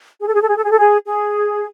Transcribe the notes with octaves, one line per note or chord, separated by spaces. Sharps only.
G#4
A4
G#4
A4
G#4
A4
G#4
A4
G#4
G#4